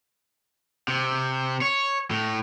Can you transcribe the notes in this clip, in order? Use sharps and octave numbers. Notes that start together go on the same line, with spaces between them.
C3
C#5
A2